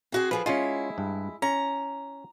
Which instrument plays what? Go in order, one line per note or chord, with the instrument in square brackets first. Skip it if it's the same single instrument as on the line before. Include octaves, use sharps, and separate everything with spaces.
[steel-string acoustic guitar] C4 F#4 G#4
[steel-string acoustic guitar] F3 G#4 A4 [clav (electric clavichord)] B4
[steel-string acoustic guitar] G#3 E4 [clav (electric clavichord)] C#4 F4
[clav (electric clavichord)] G2
[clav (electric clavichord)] C#4 [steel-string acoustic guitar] A#5